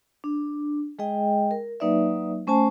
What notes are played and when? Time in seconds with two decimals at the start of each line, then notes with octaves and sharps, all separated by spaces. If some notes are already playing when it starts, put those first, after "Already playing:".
0.24 D4
0.99 G#3 G#4 D#5 G5
1.51 A#4
1.80 F#3 A#3 D#4 B4 D5 E5
2.47 A3 C#4 C5 G#5 A5